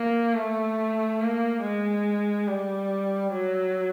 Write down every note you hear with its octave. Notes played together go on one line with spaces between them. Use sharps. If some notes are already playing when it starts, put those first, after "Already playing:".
Already playing: A#3
A3
A#3
G#3
G3
F#3